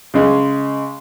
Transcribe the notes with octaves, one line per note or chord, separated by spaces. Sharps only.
C#3 G#3